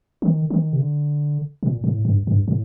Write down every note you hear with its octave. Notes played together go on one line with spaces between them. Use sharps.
D#3
D#3
C3
D3
A#2
A2
G2
G2
A2